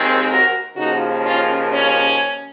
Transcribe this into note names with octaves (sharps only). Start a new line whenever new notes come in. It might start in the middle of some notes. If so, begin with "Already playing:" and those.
Already playing: D#2 D#3 G#3 C4
F#4 A#4
D#2 C#3 F3 A#3 D#4 F#4
C#4 F4
C#4